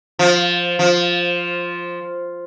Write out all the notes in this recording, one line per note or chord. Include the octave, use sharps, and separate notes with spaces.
F3
F3